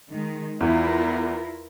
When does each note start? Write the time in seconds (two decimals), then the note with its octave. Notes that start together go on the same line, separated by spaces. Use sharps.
0.11 D#3 G#3
0.61 E2 E3 E4 F4 A#4